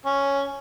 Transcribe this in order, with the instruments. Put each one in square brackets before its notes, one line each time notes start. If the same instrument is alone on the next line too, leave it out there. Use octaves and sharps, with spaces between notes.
[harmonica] C#4